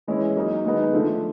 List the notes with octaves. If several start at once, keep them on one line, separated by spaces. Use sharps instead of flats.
E3 G#3 C#4 E4
F#3 A#3 D#4
D#3 G#3 B3 D#4
D3 F3 A3